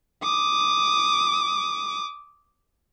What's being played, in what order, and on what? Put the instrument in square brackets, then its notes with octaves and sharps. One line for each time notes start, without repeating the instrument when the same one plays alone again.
[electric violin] D6 D#6